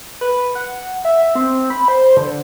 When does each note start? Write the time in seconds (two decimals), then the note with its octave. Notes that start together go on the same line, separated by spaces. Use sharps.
0.21 B4
0.55 F#5
1.05 E5
1.35 C4
1.70 B5
1.88 C5
2.17 D3